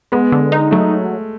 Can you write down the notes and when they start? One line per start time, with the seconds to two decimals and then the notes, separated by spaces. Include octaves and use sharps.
0.12 G#3 B3
0.32 D3
0.52 D#4
0.71 F#3 A3